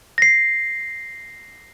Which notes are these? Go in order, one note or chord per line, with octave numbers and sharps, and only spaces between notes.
A#6 C7